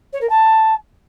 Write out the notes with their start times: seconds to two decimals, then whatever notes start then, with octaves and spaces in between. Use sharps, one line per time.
0.13 C#5
0.21 A#4
0.30 A5